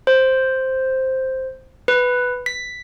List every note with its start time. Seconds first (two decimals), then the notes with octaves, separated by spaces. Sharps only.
0.07 C5
1.88 B4
2.46 B6